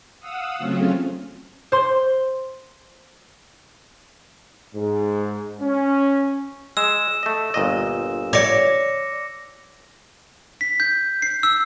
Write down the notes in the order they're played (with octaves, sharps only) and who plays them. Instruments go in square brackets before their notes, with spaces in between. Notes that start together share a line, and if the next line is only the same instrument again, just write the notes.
[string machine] F5 F#5 D#6 E6
C#3 F#3 A3 C4 C#4 F4
[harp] C5 C6
[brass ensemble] G#2
C#4
[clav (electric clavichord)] G#3 [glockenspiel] E6 E7
[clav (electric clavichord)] A3 D#5
G1 A#2 D#5
[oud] C#5 D5 [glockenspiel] D6 A#6 C#7
[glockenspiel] B6
G6
C7
E6